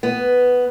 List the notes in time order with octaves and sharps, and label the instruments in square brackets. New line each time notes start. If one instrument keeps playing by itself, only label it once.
[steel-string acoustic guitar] B3